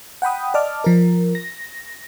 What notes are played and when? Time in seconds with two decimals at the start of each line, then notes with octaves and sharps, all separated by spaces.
0.22 F#5 G5 B5 D#6
0.54 D5 D#5 A5 D6 F6
0.84 F3 A#4
1.35 A#6